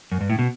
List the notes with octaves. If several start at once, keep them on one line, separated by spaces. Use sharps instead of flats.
F#2
G2
A2
B2